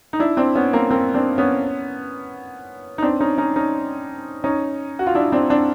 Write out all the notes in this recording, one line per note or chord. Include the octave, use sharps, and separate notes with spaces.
D#4
D4 E4
C4 D4
B3 C#4
A#3 C4
A#3 C4
C4 D4
B3 C#4
D#4
C4 D4
C#4 D#4
C#4 D#4
C#4 D#4
C#4 D#4
F#4
F4
D4 E4
C4 D4
C4 D4